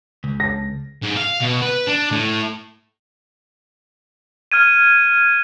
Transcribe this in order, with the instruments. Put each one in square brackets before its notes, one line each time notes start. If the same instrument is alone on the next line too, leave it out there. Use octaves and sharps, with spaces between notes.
[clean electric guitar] C#2
[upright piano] A#6
[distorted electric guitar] G#2
F5
B2
B4
D4
A2
[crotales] F6 G#6 D#7